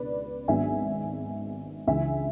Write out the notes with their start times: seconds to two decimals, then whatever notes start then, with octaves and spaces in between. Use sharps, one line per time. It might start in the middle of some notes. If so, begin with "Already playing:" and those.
Already playing: C#2 B2 C#4 B4 D5
0.48 G#1 G#2 F#3 B3 D4 E5 G#5
1.87 C#2 C#3 E3 E5 G#5